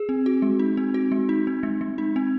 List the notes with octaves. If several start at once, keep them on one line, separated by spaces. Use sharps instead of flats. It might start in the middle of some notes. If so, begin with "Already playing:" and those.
Already playing: G#4
C4
F#4
G#3
D#4
C4
F#4
G#3
D#4
C4
G#3
G#3
D#4
C4